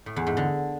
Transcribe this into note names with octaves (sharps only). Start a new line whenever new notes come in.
A2
E2
G#2
D3